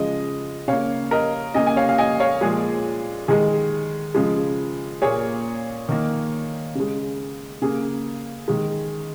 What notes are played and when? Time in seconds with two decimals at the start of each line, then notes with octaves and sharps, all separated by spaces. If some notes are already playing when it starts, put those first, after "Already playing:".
Already playing: C#3 F3 G#3 D#5
0.68 C#3 A#3 C#5 F5
1.11 A#4 D#5
1.54 C#3 A#3 D#5 G#5
1.66 G#5
1.76 C#5 F5
1.89 F5
1.98 D#5 G#5
2.20 C#5 F5
2.41 A#2 F3 G#3 G#4
3.28 D#3 G#3 G#4
4.15 C#3 F3 G#3
5.02 A#2 A#3 G#4 C#5
5.89 D#3 A#3
6.75 C#3 G#3
7.62 C#3 A#3 G#4
8.48 D#3 G#3